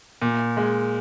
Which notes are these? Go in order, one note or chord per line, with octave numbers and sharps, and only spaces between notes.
A#2
G#3